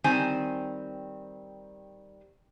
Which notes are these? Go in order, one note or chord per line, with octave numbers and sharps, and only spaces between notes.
D#3 G3 C4 G#5